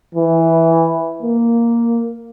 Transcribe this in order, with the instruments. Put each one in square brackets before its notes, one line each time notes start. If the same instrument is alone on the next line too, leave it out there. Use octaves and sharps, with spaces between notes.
[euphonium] E3
A#3